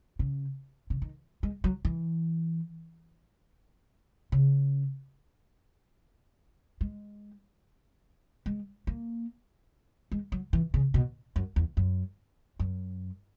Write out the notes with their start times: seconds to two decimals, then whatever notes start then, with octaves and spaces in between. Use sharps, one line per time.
0.19 C#3
0.90 C#3
1.02 D#3
1.43 G#3
1.64 F#3
1.85 E3
4.32 C#3
6.81 G#3
8.46 G#3
8.87 A#3
10.12 G#3
10.32 F#3
10.53 E3
10.74 C#3
10.94 B2
11.36 F#2
11.56 E2
11.77 F#2
12.59 F#2